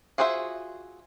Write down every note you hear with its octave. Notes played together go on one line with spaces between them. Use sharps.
F4 F#4 G#4 C5 E5